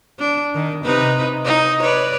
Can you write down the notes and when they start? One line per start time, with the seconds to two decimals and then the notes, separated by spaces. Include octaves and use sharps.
0.19 D4
0.54 D#3
0.85 C3 D#4 B4
1.45 D#4
1.82 B4 C#5 D5